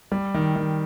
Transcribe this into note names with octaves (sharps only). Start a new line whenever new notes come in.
G3
D#3
D#3